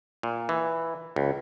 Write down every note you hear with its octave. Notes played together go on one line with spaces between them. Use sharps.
A#2
E3
C#2